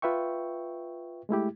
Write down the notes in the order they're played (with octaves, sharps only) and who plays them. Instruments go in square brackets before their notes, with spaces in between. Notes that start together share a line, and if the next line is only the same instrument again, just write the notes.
[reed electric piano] F4 B4 E5 G5 C#6
G#3 A3 E4 G4